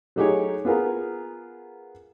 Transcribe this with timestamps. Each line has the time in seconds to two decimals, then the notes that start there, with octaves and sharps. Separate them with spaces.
0.16 F#3 A3 D#4 G4 G#4 C#5
0.65 B3 F4 G#4 A#4